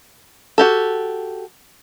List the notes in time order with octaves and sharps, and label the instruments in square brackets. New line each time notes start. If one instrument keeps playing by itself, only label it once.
[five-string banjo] F#4 G4 A4